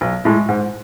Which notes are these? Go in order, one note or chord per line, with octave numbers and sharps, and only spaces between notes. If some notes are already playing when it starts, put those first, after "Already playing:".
B1
A2 G#3
G#2